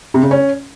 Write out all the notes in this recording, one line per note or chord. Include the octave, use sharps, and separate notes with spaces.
C3
C#3
C#4